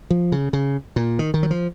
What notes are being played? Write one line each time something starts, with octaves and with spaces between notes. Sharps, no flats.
F3
C#3
C#3
A#2
D#3
D#3
F#3
F3